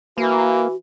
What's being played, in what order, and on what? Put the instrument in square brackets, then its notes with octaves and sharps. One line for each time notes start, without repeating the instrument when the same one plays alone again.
[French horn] E3 [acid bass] A#3 [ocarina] F#4